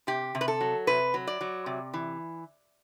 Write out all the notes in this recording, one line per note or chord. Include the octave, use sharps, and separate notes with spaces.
C3 G4
C3
B4
A4
F#3
C3 B4
F#3
D5
F#3
C3
E3